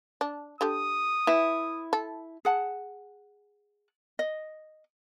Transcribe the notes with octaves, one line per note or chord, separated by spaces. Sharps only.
D4
D3 G4 A4 D#6
E3 E4
A4
G#4 F#5 A5
D#5